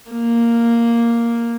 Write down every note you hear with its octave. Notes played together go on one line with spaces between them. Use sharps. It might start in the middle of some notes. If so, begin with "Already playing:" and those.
A#3